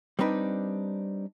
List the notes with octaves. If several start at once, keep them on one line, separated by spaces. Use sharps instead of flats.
G3 C4 D4 D#4 B4